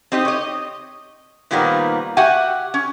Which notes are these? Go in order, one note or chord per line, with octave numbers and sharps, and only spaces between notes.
C4 D#4 G4 D#5
C#5 D#5
A#2 D#3 F3 G3 A#3 B3
F#4 G4 E5 F#5 G#5
C#4